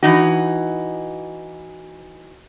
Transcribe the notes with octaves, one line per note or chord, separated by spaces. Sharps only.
E3 D#4 F#4